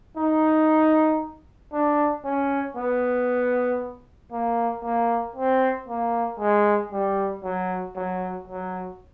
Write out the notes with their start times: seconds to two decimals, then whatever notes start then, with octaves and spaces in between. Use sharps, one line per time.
0.17 D#4
1.73 D4
2.25 C#4
2.76 B3
4.32 A#3
4.84 A#3
5.36 C4
5.89 A#3
6.40 G#3
6.92 G3
7.44 F#3
7.96 F#3
8.48 F#3